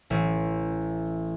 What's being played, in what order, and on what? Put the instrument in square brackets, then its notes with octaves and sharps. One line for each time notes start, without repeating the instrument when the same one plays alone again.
[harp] A1